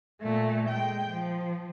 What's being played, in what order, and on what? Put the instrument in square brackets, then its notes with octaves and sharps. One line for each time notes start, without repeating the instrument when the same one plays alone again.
[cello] A#2 A3
G#3 G5
F3